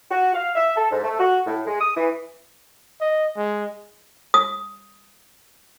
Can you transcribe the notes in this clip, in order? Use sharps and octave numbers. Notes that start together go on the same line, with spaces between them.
F#4
F5
E5
A4
G#2
A3
F#4
A2
G#3
D#6
E3
D#5
G#3
D#6